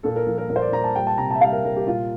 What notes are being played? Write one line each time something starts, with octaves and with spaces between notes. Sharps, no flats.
A#2 A4
A#4
F3
A#4
A#2 A#4
C5
D5
A#2 A#5
A5
G3 G5
A5
C3 A#5
E5 A5
G3 F5
A#4
G3 A#4
G4
A#2 F4